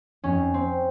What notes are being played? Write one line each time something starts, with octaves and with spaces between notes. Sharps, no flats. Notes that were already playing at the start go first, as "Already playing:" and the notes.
F2 C#4
C4